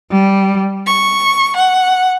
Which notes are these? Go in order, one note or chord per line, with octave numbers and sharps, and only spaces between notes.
G3
C#6
F#5